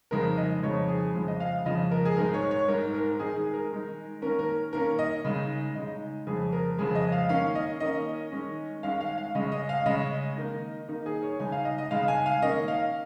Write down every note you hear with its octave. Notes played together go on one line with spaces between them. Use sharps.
F2 C#3 G#3 D#4 A#4
D#5
F2 C#3 G#3 D#4 C#5
G#4
F2 C#3 F3 G#3
D#5
F5
F2 C#3 F3 G#3 D#5
A#4
G#4
G#2 G#3 D#4 A#4
C#5
C#5
G#2 G#3 D#4 A#4
A#4
D#3 G#3 D#4 G#4
G#4
A#4
D#3 G#3 D#4
D#3 A#3 C#4 A#4
A#4
D#3 A#3 C#4 A#4
D#5
C#3 G#3 D#4
C#3 G#3 D#4 D#5
F2 C#3 G#3 G#4
A#4
F2 C#3 G#3 G#4
D#5
F5
D#3 A#3 C#4 F5
D#5
D#3 A#3 C#4 D#5
D#3 G#3 C#4
D#3 G#3 C#4 F5
F5
F5
C#3 G#3 C#4 D#5
D#5
F5
C#3 G#3 C#4 D#5
D#3 A#3 D#4
D#3 A#3 D#4
G#4
C#5
C#3 G#3 D#4 G#5
F5
D#5
D#5
C#3 G#3 D#4 F5
G#5
F5
D#3 A#3 C#4 D#5
F5